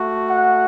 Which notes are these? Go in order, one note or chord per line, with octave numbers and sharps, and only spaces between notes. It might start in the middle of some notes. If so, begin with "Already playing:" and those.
Already playing: A3 F#4
F#5